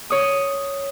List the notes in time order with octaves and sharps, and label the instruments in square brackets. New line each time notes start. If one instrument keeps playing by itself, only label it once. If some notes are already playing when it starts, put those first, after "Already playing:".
[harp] C#5 D#6